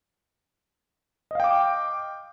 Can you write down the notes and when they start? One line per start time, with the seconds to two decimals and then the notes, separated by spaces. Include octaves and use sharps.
1.31 D#5
1.35 F5
1.40 G5
1.44 D6